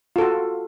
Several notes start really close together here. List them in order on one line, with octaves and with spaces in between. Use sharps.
F4 A4 F#4